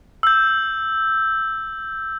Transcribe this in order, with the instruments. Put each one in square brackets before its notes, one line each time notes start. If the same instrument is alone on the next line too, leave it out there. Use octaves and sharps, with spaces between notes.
[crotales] E6 G6